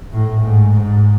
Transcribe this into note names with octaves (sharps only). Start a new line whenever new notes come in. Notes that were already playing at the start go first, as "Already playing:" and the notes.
A2
G#2
G#2